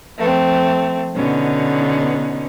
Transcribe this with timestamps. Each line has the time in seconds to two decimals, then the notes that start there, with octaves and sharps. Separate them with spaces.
0.18 F3 A3 C4
1.16 B2 D3 B3 C#4 D#4